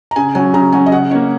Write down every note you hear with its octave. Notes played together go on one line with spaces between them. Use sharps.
A#5
C#3 G#5
F#3 C#4 G#5
C#3 A#5
F#3 C#4 G#5
D#5
C#3 F#5
A#3 C#4 C#5